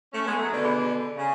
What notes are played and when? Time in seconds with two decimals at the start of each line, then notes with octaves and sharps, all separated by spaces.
0.13 A3 C#4
0.25 G#3 B3
0.38 F#3 A3
0.51 B2 D3
0.64 G#4 D5 G#5 B5
1.16 C#3